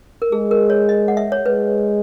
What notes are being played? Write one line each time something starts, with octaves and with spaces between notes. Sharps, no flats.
A#4
G#3 G#4
A#4
C#5
D#5
F#5
E5
C#5
G#3 B4